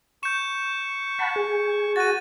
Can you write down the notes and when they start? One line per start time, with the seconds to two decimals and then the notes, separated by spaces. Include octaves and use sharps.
0.23 C#6 G6 E7
1.19 F#5 A5 B5
1.36 G#4
1.96 F#4 A6 D#7